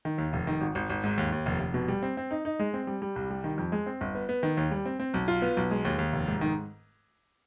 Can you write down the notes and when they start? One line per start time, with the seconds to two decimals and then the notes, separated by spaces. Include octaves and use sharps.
0.05 D#3
0.18 D#2
0.33 F1
0.47 D#3
0.61 G#1
0.75 G#1
0.90 G#1
1.04 G#2
1.18 D#2
1.32 D#2
1.46 F1
1.60 F1
1.74 B2
1.88 G3
2.03 C4
2.17 C4
2.31 D#4
2.45 D#4
2.59 G#3
2.74 C4
2.87 G3
3.02 G3
3.16 C2
3.30 G3
3.44 D#3
3.58 F2
3.72 G#3
3.86 C4
4.01 G1
4.15 B3
4.29 B3
4.43 D#3
4.57 D#2
4.71 G3
4.86 C4
5.00 C4
5.14 B1
5.28 F4
5.42 B3
5.57 B1
5.71 G#3
5.85 D#2
5.98 D#2
6.13 F1
6.27 G#2
6.41 D#3